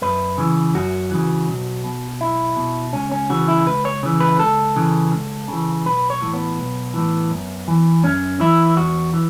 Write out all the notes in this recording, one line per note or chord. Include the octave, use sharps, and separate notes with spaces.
F#2 B4
C#3 E3
F#2 F#4
C#3 E3
B1
B2
B1 E4
B2
C#2 C#4
C#4
C#3 E3 F#4
E4
C#2 B4
C#5
C#3 E3
B4
C#2 A4
C#3 E3
C#2
C#3 E3
B1 B4
C#5
A2 E3
B3
B1
A2 E3
F#2
E3
F#2 C#4
E3 E4
E2 F#4
E3